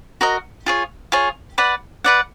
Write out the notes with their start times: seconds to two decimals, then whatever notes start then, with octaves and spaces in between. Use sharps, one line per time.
0.21 F#4 A#4 D#5
0.66 F4 G#4 C#5
1.12 F4 G#4 C#5
1.58 B4 D5 F#5
2.04 B4 D5 F#5